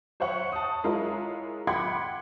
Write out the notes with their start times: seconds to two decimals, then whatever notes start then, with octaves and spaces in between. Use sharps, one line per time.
0.20 C5 C#5 E5 F#5 C#6
0.52 A5 D#6
0.84 G#3 E4 F4 A#4 C#5
1.67 F#5 G5 B5 C6 D6 G#6